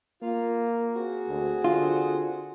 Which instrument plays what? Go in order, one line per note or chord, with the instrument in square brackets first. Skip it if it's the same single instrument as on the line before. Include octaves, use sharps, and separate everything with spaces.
[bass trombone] A#3 [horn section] F4
[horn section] C4 F#4 G#4
[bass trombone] D2
[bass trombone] D3 [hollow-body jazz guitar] F4